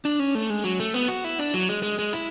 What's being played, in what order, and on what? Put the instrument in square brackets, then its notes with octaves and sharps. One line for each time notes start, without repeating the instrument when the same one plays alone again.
[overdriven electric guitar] D4
C#4
A3
G#3
F#3
A3
B3
F#4
E4
D4
F#3
G#3
G#3
G#3
E4